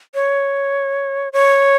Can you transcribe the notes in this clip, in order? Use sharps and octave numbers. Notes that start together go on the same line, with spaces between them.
C#5
C#5